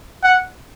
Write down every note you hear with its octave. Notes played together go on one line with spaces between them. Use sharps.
F#5